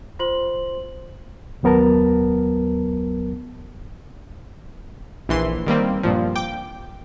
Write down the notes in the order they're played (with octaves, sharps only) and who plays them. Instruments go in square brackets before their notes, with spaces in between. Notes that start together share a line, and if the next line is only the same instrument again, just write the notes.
[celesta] F4 C5 C6 F#7
[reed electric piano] D#2 F#3 B3 A#4 A5
[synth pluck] A#1 E3 C6
D#3 G3 A#3 C4
G2 A#2 F3
G5 D6